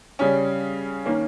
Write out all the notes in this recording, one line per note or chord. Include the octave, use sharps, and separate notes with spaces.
C#3 G3 C#4
D#3 A#3 C#4